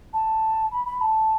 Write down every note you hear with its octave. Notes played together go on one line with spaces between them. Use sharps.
A5
B5
B5
A5